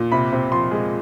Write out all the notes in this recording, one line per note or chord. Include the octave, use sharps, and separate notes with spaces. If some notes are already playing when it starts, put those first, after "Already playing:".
Already playing: A#2
C3 B5
C3
F3 C6
G#3